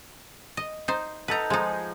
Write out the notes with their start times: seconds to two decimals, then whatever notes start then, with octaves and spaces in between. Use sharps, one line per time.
0.57 D#5
0.88 D#4 C5
1.28 D#4 A4 B4 F#5 A#5
1.50 F3 G#3 D#4 G#4